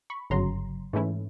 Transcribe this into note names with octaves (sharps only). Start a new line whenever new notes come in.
B5 C#6
G1 F#2 C#3 F#3 A#5 C6
G#2 E3 A3 C#4 E4